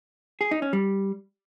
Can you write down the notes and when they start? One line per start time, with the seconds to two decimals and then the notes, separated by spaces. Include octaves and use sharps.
0.41 G#4
0.51 D#4
0.62 C#4
0.73 G3